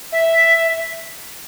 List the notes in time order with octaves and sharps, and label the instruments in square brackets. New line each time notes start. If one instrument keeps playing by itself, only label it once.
[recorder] E5